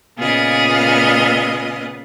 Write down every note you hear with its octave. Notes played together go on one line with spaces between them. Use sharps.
A#2 C#3 B3 F4 G#4 D#5